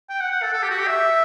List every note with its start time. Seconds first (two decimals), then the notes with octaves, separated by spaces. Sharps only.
0.09 G5
0.20 F#5
0.31 F#5
0.42 A4
0.53 A4
0.62 G4
0.70 F#4
0.79 G4
0.87 E5